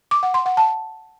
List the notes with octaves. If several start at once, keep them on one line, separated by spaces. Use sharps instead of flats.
D6
F#5
C6
F#5
A5